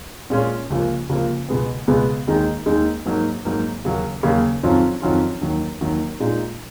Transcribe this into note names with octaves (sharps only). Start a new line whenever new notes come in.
A#2 G#3 C#4 F4
C#2 C#3 F3 A#3
C#2 C#3 F3 A#3
C#2 B2 G#3 B3
C#2 B2 G#3 B3
D#2 D#3 G#3 D#4
D#2 D#3 G#3 D#4
G#2 F#3 A#3 D#4
G#2 F#3 A#3 D#4
D#2 C#3 F#3 A#3
D#2 C#3 F#3 A#3
F2 D#3 F#3 C#4 F4
F2 D#3 F#3 C#4 F4
D#2 D#3 F#3
D#2 D#3 F#3
A#2 G#3 D#4